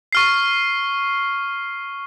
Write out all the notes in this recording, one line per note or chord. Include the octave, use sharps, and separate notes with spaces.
C#6 F6 C7